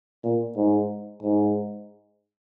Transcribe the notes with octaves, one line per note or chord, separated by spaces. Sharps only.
A#2
G#2
G#2